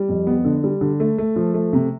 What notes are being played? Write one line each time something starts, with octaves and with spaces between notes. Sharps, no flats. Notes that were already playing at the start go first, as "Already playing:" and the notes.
Already playing: G3
F2
B3
D3
G3
D3
A3
A3
F3
A3
C3